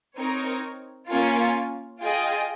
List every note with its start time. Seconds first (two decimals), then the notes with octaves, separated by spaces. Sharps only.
0.16 C4 D#4 A#4 C#5
1.08 A#3 C#4 F4
1.99 F4 G#4 D#5 G5